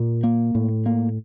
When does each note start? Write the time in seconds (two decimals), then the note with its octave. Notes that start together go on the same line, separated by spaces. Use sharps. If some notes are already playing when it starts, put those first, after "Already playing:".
Already playing: A#2
0.24 A#3
0.55 A2
0.86 A#3